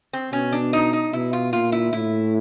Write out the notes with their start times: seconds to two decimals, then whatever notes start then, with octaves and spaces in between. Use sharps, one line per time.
0.13 C4
0.32 B2 C#4
0.52 D4
0.73 D#4
0.93 D#4
1.13 B2 E4
1.33 F4
1.52 A#2 F4
1.72 E4
1.93 A2 E4